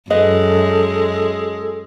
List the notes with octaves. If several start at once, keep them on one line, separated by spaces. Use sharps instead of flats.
F#2 G#3 A4 B4 D#5